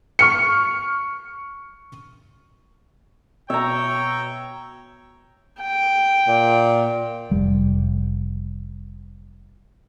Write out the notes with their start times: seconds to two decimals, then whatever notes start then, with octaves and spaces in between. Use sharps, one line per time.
0.19 C#6 F6 C#7
3.50 B2 C#5 E5 G5 A#5
5.62 G5
6.27 A#2
7.31 F1 G3